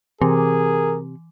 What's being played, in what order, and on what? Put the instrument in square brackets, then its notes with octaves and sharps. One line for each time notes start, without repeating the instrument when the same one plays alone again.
[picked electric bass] C3 [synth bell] E3 [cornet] G#4 [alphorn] A#4